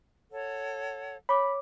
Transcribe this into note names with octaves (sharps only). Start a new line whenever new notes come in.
A4 C#5 F#5
C#5 B5 D6